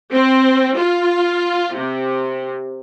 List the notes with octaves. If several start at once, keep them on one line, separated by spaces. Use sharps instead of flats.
C4
F4
C3